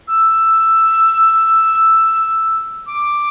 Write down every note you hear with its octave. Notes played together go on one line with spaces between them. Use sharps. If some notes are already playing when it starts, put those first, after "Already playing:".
E6
D6